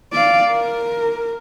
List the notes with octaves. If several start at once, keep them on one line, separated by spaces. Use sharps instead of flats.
D5 F5
A#4